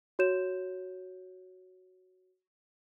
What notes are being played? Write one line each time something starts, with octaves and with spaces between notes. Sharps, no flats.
F#4 C#5 G6 E7